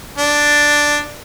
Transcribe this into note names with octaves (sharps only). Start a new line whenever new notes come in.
D4